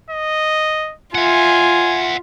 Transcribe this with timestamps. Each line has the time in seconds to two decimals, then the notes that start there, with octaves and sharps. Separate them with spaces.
0.10 D#5
1.15 F4 E5 F#5 G#5